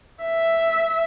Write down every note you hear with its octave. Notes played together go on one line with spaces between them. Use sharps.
E5